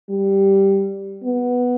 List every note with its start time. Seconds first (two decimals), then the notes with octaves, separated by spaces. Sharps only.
0.10 G3
1.24 B3